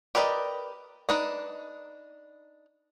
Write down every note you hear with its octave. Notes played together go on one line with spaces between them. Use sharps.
G4 A#4 B4 D5 D#5
D4 D#4 B4 D#5